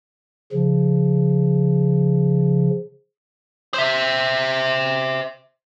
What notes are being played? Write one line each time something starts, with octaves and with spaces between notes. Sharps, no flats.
C#3 F3
C5 E5